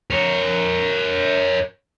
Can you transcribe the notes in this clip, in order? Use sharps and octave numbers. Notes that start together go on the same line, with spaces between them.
A#4 C#5